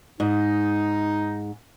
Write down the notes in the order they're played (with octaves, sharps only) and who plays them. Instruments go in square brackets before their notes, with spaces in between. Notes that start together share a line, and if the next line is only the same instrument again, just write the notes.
[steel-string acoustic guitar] G#2 [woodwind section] D#4